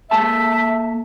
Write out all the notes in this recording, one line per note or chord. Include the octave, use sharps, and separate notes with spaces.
A#3 A4 E5 A5